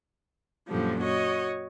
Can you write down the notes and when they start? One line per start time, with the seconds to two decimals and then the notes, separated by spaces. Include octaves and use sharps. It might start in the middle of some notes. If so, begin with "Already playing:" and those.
0.69 F#2 A#2 D3 F3 G3
1.01 F#4 C#5 D#5